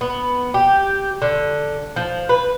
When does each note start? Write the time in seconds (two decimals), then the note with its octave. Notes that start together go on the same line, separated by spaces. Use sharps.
0.01 B3
0.54 G4
1.22 D3
1.96 F3
2.29 B4